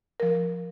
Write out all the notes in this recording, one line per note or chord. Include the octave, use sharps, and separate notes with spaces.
F3 A#4